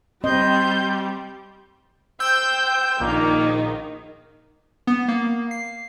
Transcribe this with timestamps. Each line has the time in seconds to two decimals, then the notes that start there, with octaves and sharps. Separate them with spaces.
0.24 G3 C4 D#5 C6 G6
2.20 C5 G5 E6 G6
3.00 A#1 D#3 A#3 D#4
4.87 B3
5.08 A#3
5.51 C7